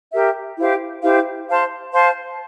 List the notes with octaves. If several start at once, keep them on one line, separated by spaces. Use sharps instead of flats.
G4 A#4 E5
E4 G4 C5 F5
E4 G4 C5 F5
C5 F5 A5 C6
C5 F5 A5 C6